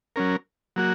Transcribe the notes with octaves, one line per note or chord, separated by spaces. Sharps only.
F#3 C#4 A#4
F#3 A#3 F#4